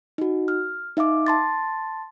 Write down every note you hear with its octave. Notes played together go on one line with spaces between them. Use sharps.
D#4 F#4
F6
D#4 E5 F5 D6
A5 C6 A6